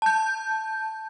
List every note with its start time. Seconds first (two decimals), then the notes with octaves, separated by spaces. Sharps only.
0.02 A5 G6